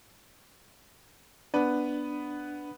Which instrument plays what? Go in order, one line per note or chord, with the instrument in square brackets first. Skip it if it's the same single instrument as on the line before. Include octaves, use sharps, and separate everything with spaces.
[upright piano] B3 B4 [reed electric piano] D4